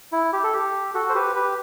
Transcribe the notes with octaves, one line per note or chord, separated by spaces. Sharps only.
E4
G4
A4
G4
F#4 A4
C5
G4 B4
G4 B4